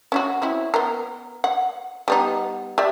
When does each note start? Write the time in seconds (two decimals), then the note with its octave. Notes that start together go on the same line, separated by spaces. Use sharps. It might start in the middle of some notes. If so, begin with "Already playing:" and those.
0.12 C#4 E4 F#4
0.42 C4 C#4 E4
0.74 B3 A#4
1.44 F#5
2.08 G3 B3 D#4
2.78 G4 D5 E5